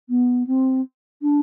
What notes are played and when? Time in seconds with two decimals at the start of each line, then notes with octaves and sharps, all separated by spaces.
0.09 B3
0.46 C4
1.21 D4